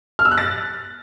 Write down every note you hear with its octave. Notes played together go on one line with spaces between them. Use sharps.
F6
E6
F#6
A6